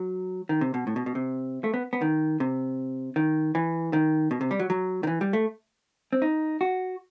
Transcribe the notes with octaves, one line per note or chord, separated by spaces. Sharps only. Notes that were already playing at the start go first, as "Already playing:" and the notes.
Already playing: F#3
D#3
C3
B2
A2
B2
B2
C3
A3
B3
B3
D#3
C3
D#3
E3
D#3
B2
C3
G3
F#3
F#3
D#3
E3
G3
A3
C4
D#4
F#4